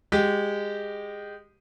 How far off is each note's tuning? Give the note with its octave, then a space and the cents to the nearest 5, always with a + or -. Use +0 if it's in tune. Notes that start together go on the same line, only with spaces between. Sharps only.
G#3 -20 G4 -10